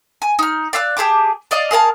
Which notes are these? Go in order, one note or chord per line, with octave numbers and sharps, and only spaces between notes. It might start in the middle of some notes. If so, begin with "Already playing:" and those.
G#5
D#4 F6
D5 F5 E6 F#6
G4 G#4 A5 D6
D5 D#5 F5
G#4 A#4 F5 A5